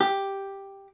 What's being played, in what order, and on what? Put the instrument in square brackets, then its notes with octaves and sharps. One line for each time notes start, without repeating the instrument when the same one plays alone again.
[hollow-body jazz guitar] G4